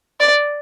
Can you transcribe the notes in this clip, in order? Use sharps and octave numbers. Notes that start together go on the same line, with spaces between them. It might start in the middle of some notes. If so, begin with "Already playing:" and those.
D5